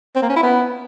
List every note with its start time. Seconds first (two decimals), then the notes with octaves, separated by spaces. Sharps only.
0.16 C4
0.22 A#3
0.29 C#4
0.36 E4
0.43 B3